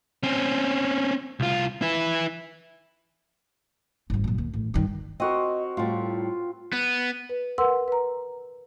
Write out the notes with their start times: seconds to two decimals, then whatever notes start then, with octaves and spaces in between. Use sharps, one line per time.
0.23 C4 C#4
1.40 C2 F4
1.82 E4 B4
4.10 G#1 G2
4.24 F#2 A#2
4.38 D#2
4.54 A1
4.74 G2 D#3
5.20 C4 F#4 A#4 D#5
5.77 A2 G3 F4
6.73 B3
7.29 B4
7.58 A#4 B4 F#5 C6 E6
7.88 B4 A#5